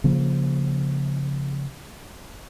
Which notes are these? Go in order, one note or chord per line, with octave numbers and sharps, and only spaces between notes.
C#3 F3 A#3